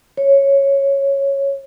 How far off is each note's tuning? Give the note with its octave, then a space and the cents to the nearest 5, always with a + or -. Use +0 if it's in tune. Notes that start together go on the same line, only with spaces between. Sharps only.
C#5 -5